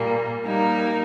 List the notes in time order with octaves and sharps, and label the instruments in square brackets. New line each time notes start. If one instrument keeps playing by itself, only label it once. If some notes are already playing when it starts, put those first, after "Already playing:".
Already playing: [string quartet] A#2 G3 A#3
G3 A#3 D#4